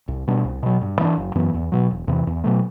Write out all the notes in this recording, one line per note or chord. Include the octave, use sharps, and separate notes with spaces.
C2
B2 G3 D4
C2
B2 F#3
G2
E3 B3
D4
F#1
F#2 E3 B3
E2
B2 F#3
E1
E2 C3 E3
E2
B2 F#3 A3